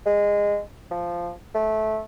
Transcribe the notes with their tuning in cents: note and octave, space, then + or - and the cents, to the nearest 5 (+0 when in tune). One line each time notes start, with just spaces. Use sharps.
G#3 -15
F3 -5
A3 -15